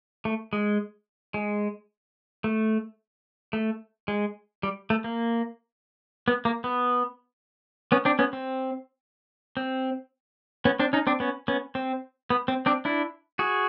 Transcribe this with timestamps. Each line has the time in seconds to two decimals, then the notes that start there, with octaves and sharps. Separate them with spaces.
0.25 A3
0.53 G#3
1.34 G#3
2.44 A3
3.53 A3
4.08 G#3
4.63 G3
4.90 A3
5.04 A#3
6.28 B3
6.45 A#3
6.64 B3
7.92 B3 C#4
8.05 C4 D4
8.19 B3 C#4
8.33 C4
9.57 C4
10.65 B3 C#4
10.80 C4 D4
10.93 C#4 D#4
11.07 C4 D4
11.20 B3 C#4
11.48 B3 C#4
11.75 C4
12.30 B3
12.48 C4
12.66 C4 D4
12.85 D4 E4
13.39 F#4 G#4